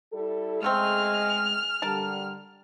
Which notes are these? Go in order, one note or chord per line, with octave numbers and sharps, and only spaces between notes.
G3 E4 A4
C#3 G#3 A3 C4 F6
D3 G3 A#4 A5